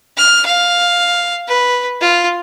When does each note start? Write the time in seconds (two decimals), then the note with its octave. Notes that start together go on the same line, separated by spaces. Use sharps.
0.17 F6
0.45 F5
1.48 B4
2.01 F4